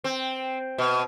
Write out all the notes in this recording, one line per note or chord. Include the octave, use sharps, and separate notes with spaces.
C4
B2